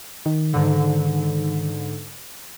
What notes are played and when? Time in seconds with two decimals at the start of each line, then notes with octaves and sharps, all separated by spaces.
0.26 D#3
0.54 G#2 D3